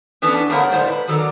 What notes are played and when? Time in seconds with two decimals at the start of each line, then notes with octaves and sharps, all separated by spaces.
0.22 E3 B3 C#4 D4 A4
0.50 G2 A3 B3 A#4 C#5 F#5
0.72 A2 G#3 C5 D5
0.87 B4
1.07 D#3 F#3 A4 A#4 D5